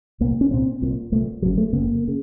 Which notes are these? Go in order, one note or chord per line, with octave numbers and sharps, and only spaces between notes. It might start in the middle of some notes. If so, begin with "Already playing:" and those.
C2 A#2 A#3
C#4
C2 A#2 C4
C2 A#2
C2 A#2 A3
F#1 F#2 C#3 F#3
A3
F#1 F#2 C#3 A#3
C#3